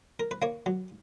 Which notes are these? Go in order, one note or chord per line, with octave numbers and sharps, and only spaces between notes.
A#4
B4
A#3 C#5
F#3